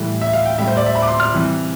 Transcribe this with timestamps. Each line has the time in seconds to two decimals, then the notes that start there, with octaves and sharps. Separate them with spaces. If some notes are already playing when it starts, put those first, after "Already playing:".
Already playing: A2 E3 G3
0.21 E5
0.33 F5
0.45 G5
0.58 A2 G3 E5
0.67 C5
0.77 D5
0.86 E5
0.95 B5
1.02 D6
1.08 C6
1.20 F6
1.32 C3 E3 G3